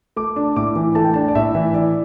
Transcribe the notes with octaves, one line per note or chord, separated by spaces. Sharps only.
A3 D6
D4
A2 D6
E3
A3 A5
G5
D4 A5
D5
A2 E5
E3
E4 D5